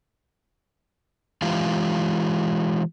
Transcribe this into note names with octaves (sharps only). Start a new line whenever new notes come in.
E3 G#3 F4 G4 F5